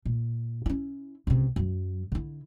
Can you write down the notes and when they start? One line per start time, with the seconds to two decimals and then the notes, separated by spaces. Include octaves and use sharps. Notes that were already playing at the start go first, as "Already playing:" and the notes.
0.05 A#2
0.66 C#4 E4
1.27 C#2 C3
1.56 F#2 F#3
2.12 D3 E4